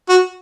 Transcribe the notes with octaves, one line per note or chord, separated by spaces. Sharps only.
F#4